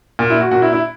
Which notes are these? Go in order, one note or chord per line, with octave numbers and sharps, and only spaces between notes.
A#2
E4
F#4
A#2 F#4
E4
E4